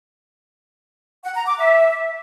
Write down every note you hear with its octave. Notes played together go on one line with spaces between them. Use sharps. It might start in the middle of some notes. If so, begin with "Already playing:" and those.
F#5
A#5
D6
E5